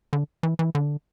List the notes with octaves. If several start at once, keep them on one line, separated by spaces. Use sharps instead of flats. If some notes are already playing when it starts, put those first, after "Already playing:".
D3
E3
E3
D3